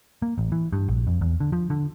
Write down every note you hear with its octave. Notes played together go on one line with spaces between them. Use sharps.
A#3
A1
E3
G2
A#1
F2
E2
D3
F3
D3